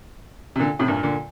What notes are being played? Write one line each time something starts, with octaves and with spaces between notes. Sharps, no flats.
C3
A#2 D3
A2 C3
G2 A#2
A#2 D3